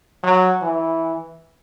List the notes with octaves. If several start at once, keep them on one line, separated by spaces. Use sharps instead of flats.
F#3
E3